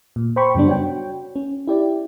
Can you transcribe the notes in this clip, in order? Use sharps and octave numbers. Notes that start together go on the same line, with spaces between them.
A#2
C5 G5 B5 C#6
F#2 C#3 G3 B3 D4
F#4 C#5 G5
C#4
E4 G4 D5